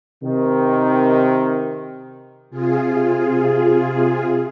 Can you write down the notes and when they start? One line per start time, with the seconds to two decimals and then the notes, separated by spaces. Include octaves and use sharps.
0.23 C3 D#3
2.50 C3 F4 G#4